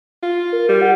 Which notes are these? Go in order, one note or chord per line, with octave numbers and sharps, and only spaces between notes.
F4
A#4
G3 G4
F#5